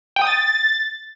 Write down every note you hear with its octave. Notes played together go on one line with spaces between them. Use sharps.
G5
D#6
A6